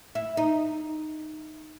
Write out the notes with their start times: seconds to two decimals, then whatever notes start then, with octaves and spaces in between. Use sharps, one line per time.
0.15 E4
0.37 D#4